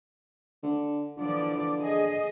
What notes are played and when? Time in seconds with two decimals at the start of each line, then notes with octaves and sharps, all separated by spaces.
0.63 D3
1.18 D3 E3 F3 D5
1.80 G#4 D#5